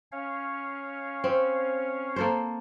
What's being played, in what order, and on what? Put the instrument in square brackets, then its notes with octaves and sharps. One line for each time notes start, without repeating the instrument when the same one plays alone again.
[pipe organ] C#4 C#5 F5
[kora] C4
A#3 A4 C5